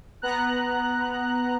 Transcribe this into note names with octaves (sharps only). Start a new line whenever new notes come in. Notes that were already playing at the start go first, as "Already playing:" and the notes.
B3 A#5 F#6